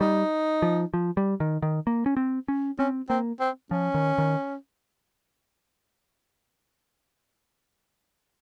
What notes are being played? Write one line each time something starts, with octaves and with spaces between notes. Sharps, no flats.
G3 D#4
F3
F3
G3
D#3
D#3
A#3
C#4
C4
C#4
C4 C#4
A#3 C4
C4
F3 C#4
D#3
D#3